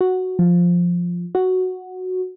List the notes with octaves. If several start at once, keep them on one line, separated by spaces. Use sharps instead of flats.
F#4
F3
F#4